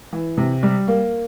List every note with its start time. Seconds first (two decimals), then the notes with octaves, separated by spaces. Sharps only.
0.13 E3
0.38 C3
0.63 G3
0.88 A#3